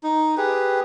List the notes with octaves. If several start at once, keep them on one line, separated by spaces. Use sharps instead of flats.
D#4
G4 G#4 B4